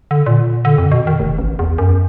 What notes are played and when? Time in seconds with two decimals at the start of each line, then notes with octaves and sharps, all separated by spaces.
0.11 D3
0.26 A#2
0.65 D3
0.78 F2
0.92 B2
1.07 D#3
1.20 F1
1.38 A1
1.59 E2
1.78 F#2